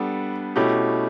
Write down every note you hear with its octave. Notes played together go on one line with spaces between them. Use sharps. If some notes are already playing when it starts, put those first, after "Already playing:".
Already playing: G3 B3 D4 A4
B2 A3 C#4 E4 G4